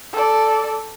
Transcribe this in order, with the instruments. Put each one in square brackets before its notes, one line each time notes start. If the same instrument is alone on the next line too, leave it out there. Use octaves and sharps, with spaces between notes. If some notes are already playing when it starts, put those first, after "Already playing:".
[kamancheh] A4 D5